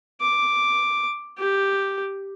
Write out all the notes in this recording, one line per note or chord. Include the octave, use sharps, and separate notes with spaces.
D6
G4